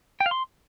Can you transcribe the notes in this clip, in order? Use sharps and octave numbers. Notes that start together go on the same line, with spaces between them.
G5
F5
C6